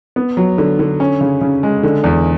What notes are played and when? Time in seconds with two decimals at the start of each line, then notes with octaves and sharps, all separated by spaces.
0.16 B3
0.37 F#3
0.58 D3
0.79 D3
1.00 C#4
1.21 C#3
1.41 C#3
1.63 G#3
1.83 D3
2.04 E2